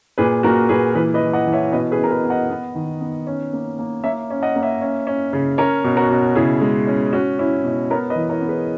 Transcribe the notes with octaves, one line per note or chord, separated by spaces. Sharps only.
A#2 G#4 B4
A#2 F#4 A#4
A#2 G#4 B4
E3 G#4 B4
B4 D#5
E3
D#5 F#5
E3
C#5 E5
B2 B4 D#5
G#4 B4
B2
A#4
G#4 B4
B3
D#5 F#5
B3
D#3
B3
C#4
A#3
A#3
A#3 C#5 E5
C#4
D#5 F#5
A#3
C#5 E5
C#4
C#4
C#3
C#4 A#4 C#5
B2
F#4 A#4
B2
C#3 E4 G#4
G#3
C#4
C#4 F#4
C#4 E4
B2
B3 A#4 C#5
B4 D#5
E3
A#4 C#5
B3
G#4 B4